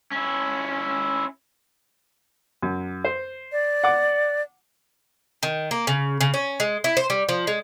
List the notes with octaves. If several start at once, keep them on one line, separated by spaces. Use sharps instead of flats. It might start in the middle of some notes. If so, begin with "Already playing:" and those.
C#4 E4
F#2
C5
D5
F#5 D6
D#3
A#3
C#3
C#3
C#4
G#3
E4
C5
G3
F3
G#3